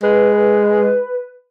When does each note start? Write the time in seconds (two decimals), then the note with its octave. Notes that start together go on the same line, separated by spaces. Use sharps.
0.03 G#3 B4